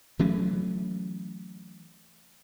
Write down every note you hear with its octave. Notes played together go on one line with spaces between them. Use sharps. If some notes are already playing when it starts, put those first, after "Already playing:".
E3 F#3 A3 C#4